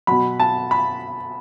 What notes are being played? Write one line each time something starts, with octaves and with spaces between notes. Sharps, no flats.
B2 F#3 B5
A5
B5